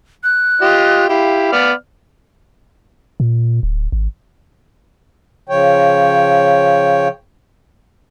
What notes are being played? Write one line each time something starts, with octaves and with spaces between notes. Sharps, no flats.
F#6
F4 G4 D#5
E4 G4 F5
B3 D5 F6
A#2
D1
G#1
C#3 F3 C#5 G5